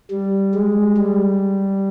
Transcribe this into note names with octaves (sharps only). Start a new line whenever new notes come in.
G3
G#3
G3